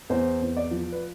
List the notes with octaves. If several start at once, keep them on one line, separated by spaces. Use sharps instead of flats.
E2 C5
E2
D5
F3
B4